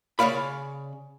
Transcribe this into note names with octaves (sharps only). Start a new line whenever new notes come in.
C#3 C#5 D5 F5 B5